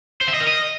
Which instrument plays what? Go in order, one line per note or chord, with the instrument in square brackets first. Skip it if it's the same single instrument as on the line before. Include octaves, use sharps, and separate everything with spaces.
[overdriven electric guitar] C5
E5
D#5
A#4
D#5